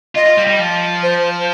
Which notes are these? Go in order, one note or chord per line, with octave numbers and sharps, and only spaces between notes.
F4 D#5
F4
G3
G3
F3
C5